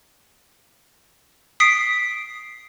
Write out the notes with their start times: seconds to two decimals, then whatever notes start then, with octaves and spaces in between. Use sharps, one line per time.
1.60 D#6 B6 C7 D7